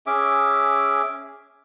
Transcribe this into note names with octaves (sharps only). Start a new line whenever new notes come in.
C#4 G#4 E5 D6